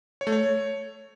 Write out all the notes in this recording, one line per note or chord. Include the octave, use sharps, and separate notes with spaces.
C#5
A3
C#5